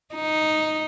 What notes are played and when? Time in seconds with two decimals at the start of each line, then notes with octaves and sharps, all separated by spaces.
0.15 D#4